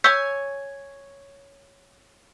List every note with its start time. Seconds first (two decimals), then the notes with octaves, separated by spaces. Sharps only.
0.04 C#5 G#5 E6 G6 B6